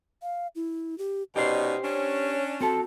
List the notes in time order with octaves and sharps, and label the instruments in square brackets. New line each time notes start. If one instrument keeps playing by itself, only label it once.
[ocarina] F5
E4
G4
[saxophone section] B2 C#4 D#4 [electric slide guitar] G4 C5 [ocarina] D5
[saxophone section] C#4 D4 [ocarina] C#5
[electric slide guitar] C4 A4 A5 [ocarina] F#4